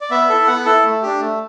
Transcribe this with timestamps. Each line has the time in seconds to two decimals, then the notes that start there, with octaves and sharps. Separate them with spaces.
0.01 D5
0.11 B3 E5
0.29 E4 A4
0.47 B3 F#5
0.65 E4 A4
0.85 A3
1.02 D4 G4
1.21 A3